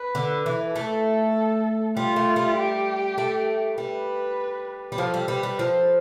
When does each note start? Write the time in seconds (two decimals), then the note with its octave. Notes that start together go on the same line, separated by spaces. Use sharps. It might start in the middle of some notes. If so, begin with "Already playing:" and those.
Already playing: B4
0.15 D3
0.46 E3
0.75 A3 A4
1.97 G3 F4
2.16 A3
2.36 G3
2.57 G4
3.18 A3
3.78 G3 B4
4.92 G3
4.98 F3 A4
5.14 G3
5.28 G3 B4
5.43 G3
5.59 F3 A4